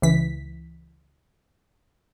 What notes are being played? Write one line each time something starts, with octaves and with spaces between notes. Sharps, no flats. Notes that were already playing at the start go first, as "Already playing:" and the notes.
C#2 E3 B6